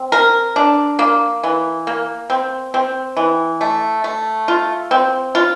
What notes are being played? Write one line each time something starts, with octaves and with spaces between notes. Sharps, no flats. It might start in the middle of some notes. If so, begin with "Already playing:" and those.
Already playing: C4
A#4
D4
A#3
E3
A#3
C4
C4
E3
A3
A3
F4
C4
F4